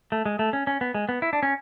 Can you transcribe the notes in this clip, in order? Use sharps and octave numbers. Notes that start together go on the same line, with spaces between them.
A3
G#3
A3
C#4
C#4
B3
G#3
B3
E4
D4
C#4